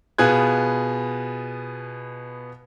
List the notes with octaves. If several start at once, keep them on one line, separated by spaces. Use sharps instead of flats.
B2 B3 F4 G#4 F#6 G#6